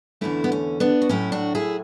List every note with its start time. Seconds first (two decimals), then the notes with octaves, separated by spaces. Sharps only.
0.21 E2 D3 A3 C#4 E4
0.44 B3
0.52 C#4
0.80 B3 D4
1.02 F#4
1.09 A2 F#3 A3 C#4 E4
1.32 D4 F#4
1.55 E4 G#4